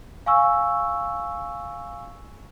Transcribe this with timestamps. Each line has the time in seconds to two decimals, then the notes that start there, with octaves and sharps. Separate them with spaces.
0.26 F5 G#5 C#6 E6